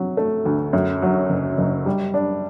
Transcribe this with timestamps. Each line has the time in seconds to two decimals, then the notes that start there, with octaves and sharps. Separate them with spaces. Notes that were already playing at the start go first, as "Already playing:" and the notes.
Already playing: C3 F#3
0.17 A3
0.45 D2
0.73 F#2
1.02 F#3
1.30 F#1
1.58 F#1
1.86 G3
2.14 D4